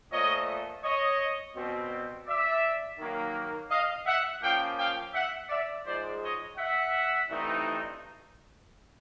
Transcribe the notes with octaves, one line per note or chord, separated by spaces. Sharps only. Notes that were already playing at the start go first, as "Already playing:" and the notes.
A#2 F3 A3 C#5 D#5
C#5 D#5
B2 G3 C4
D5 E5
D#3 F#3 A#3
D#5 F5
E5 F#5
F3 A#3 C#4 F5 G5
F5 G5
E5 F#5
D5 E5
G#2 F3 G#3 C5 D5
C#5 D#5
E5 F#5
G2 E3 A3 C4 D#4